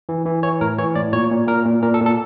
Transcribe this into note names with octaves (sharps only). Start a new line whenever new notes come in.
E3
E3
E3 C#5
A2 A#4
E3 C#5
A2 D5
A#2 C#5
A#2
A#2 A#4
A#2
A#2 A#4
A4
A#2
A4